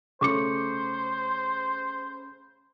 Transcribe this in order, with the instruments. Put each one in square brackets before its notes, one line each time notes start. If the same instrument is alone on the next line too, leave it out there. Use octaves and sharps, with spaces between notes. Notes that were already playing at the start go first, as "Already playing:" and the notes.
[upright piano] C#3 A3 [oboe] C5 [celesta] C#6 D6 C#7